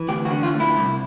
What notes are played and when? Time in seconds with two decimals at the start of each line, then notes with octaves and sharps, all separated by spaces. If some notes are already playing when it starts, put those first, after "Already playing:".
Already playing: E3
0.08 D2 G4
0.25 F#4
0.31 D3
0.43 F4
0.54 D2
0.60 E4
0.78 C2